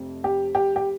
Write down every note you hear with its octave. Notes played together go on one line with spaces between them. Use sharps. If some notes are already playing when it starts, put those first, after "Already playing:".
Already playing: F1 F2 C3
G4
G4
G4